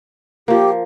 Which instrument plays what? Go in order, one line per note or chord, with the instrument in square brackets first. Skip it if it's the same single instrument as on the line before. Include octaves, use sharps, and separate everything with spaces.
[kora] F3 A#3 [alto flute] G4